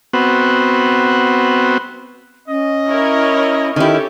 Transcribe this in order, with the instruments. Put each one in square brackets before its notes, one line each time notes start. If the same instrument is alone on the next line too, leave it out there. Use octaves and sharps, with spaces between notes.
[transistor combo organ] B3 C4 F#4
[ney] C#4 [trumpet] D#5
[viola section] E4 A#4 C#5
[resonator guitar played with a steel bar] D#3 E4 [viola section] C#4 G4 A4 [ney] G5